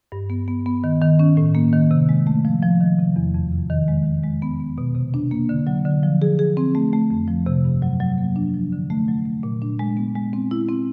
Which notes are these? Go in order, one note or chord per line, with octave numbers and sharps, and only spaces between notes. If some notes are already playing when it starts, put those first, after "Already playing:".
G2
B3
B3
B3
D#3
D#3
C#4
A2
A#3
D#3
C3
G#3
A3
F3
F3
D#3
C3
E2
F2
C3
D#3
G#3
G#3
G#3
B3
B3
B2
C3
D4
A#3
D3
F#3
D3
F3
G#4
G#4
C4
A3
A3
F2
F3
C3
G2
F#3
F#3
A#3
D4
F3
D3
A3
F#3
A3
A#2
D4
G#3
B3
G#3
C4
E4
C4